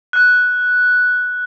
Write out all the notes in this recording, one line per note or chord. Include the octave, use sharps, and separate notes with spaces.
F#6